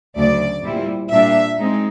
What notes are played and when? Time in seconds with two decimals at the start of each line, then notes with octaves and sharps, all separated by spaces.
0.16 D2 C#3 F#3 A3 D5
0.63 A#2 G3 C4 E4
1.10 A#2 G3 A#3 D4 E5
1.58 G#3 C4 D#4